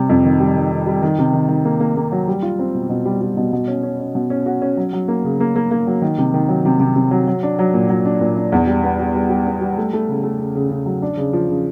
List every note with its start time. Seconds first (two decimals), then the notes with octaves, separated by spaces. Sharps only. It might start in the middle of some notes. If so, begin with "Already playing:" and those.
Already playing: C3 G3
0.09 F2
0.25 D#3
0.40 G3
0.55 D#3
0.71 D#3
0.87 G3
1.02 D#3
1.19 C3
1.33 D#3
1.49 D#3
1.65 A#3
1.80 A#3
1.97 A#3
2.12 F#3
2.28 G3
2.42 F4
2.59 C4
2.75 B2
2.89 B2
3.05 G3
3.21 G3
3.37 B2
3.53 B2
3.67 C#4
3.83 C#4
4.00 C#4
4.15 B2
4.30 C#4
4.46 F#4
4.62 C#4
4.77 F#3
4.93 F#3
5.08 A#3
5.24 C#3
5.40 A#3
5.56 A#3
5.71 A#3
5.87 F#3
6.02 D#3
6.18 C3
6.34 D#3
6.48 F#3
6.65 C3
6.80 C3
6.96 C3
7.11 F#3
7.28 F#3
7.43 D4
7.59 F#3
7.74 A#2
7.89 F#3
8.06 D4
8.21 A#2
8.37 D4
8.52 E2
8.67 G3
8.83 B3
9.00 G3
9.14 G3
9.30 G3
9.46 B3
9.61 G3
9.78 A3
9.93 A3
10.09 C#3
10.24 A3
10.39 C#3
10.55 C#3
10.70 C#3
10.86 F#3
11.02 D4
11.17 C#3
11.33 F3
11.49 C#3